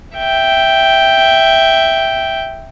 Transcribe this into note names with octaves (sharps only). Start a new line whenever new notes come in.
E5 G5